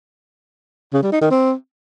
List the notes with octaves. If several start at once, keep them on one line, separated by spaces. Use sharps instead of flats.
C#3
G3
D#4
D#3
C4